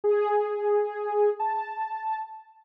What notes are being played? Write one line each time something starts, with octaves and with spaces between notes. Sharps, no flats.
G#4
A5